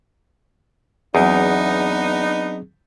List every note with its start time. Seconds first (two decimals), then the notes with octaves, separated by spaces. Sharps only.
1.15 E2 F#3 B3 C4 D4 D#4 G#4